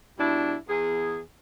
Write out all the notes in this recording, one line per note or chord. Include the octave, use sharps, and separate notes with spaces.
B2 G3 D4 E4
E2 G#4